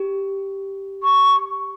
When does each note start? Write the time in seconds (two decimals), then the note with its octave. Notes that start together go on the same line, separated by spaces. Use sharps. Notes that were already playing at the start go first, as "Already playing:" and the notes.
Already playing: G4
1.03 C#6